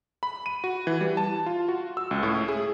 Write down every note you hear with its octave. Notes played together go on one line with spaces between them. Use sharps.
B5
D#7
F#4
E3
G3
A5
F4
F#4
E6
C#2
A2
G#4